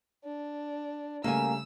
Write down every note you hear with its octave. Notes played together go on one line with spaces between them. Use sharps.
D4
C#3 G3 A3 A#3 G#5 E6